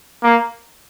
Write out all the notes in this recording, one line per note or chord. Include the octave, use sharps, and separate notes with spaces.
A#3